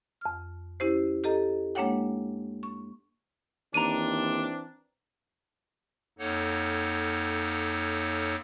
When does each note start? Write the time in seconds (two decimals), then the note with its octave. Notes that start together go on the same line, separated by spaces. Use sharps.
0.21 F2 F6
0.80 C#4 E4 G4 C5
1.24 G4 A4 D#5 A#5
1.75 G#3 A#3 D4 C#5 F#5 G5
2.63 C#6
3.74 D#2 E3 C4 D4 A#5 D#7
6.19 F2 A#3 D#4 A4 C#5 F#5